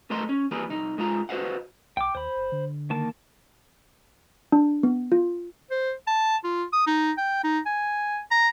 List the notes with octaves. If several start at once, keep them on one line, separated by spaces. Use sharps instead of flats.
B1 A3 B3 A#4 D#5 C6
C#4
E3 G3 A#3 G#4 A#4 B4
C2 D#4
G#2 G#3 F4 A#5
F#4 B4 C5 D#5 F5 F#5
B1 G5 D6
D#2 C5 B5
G1
D3
D#3 A#3 A5
D4
B3
F4
C5
A5
F4
D#6
D#4
G5
D#4
G#5
A#5